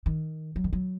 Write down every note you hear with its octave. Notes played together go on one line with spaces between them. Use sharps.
D#3
F#3
D#3
F#3